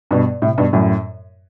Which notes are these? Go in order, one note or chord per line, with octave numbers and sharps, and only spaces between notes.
G2 B2
A2 C3
G2 B2
F#2 A2